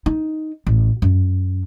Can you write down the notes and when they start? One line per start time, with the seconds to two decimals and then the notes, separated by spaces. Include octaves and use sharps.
0.06 D#4
0.67 A1
1.02 F#2